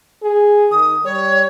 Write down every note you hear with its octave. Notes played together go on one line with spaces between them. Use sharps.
G#4
D#3 D#6
G3 C#5